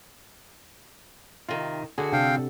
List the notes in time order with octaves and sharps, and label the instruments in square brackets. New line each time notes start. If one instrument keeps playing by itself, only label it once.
[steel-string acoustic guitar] C3 D#3 [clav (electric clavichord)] F4
[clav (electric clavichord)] D3 G#4 [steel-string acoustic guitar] F#4
[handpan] C3 D4 A4 [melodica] F5 G5